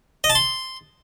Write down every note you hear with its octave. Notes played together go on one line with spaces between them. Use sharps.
D#5
A5
C6